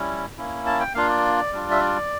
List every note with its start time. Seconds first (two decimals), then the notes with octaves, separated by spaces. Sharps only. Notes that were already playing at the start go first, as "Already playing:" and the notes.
Already playing: G3 C#4 E4
0.38 A#3 C#4 E4
0.66 A5
0.80 G5
0.94 A#3 D4 F4 F5
1.09 D5
1.52 G3 D4 F4
1.71 E5
1.81 D5